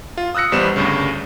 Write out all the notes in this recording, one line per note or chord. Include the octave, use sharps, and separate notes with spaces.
F4
D#6 E6 F#6 A#6 C#7
A1 G3 B3 C5 E7
D2 G2 C#3